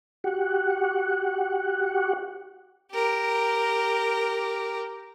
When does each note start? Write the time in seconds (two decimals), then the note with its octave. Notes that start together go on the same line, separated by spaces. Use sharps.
0.24 F#4 G4 F#5
2.92 G4 A#4